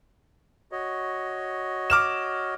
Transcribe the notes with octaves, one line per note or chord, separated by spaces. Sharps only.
F#4 C#5 D#5
D6 F6 E7